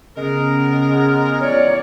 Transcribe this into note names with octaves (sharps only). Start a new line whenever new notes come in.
C#3 G#3 B3 A#4
C#5 D5